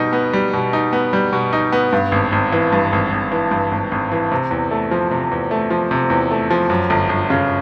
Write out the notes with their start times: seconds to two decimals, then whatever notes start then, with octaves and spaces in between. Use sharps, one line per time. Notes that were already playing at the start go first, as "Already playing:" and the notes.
Already playing: B2 G3 D#4
0.13 B3
0.33 G3
0.53 B2
0.73 D#4
0.93 B3
1.13 G3
1.33 B2
1.53 D#4
1.72 B3
1.93 G2
2.12 G#1
2.32 G#1
2.52 E3
2.72 G2
2.92 G#1
3.12 G#1
3.32 E3
3.51 G2
3.71 G#1
3.91 G#1
4.12 E3
4.31 C3
4.51 E2
4.71 A3
4.91 F3
5.11 C3
5.31 E2
5.51 A3
5.70 F3
5.91 C3
6.10 E2
6.31 A3
6.50 F3
6.69 F#2
6.90 G1
7.09 G1
7.30 C#3